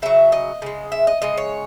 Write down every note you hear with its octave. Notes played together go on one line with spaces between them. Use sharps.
C#3 F#3 E5
D#5
C#3 G#3
E5
D#5
C#3 G#3 D#5
C#5